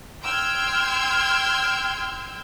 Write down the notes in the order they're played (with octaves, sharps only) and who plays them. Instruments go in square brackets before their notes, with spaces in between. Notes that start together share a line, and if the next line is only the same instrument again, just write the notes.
[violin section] G5 C6 E6 F6 G6 G#6